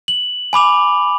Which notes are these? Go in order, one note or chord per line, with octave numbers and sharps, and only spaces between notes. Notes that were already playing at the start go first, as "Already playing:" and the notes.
F#7
G#5 B5 D6 F7